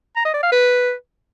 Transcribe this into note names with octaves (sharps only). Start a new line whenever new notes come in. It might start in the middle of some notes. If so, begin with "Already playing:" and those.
A#5
D#5
D5
F5
B4